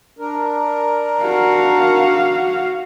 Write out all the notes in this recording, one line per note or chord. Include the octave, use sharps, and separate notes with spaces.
D4 A#4
F#4 F5